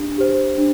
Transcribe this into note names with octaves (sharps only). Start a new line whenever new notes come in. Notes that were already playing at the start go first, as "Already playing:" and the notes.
Already playing: D4 G4
G4 C5
D4